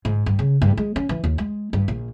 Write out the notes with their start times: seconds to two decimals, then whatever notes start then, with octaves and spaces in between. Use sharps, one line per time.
0.05 G#2
0.26 G2
0.39 C#3
0.61 G2
0.77 G#3
0.96 C#4
1.09 E3
1.24 D#2
1.38 G#3
1.73 G2
1.88 A#1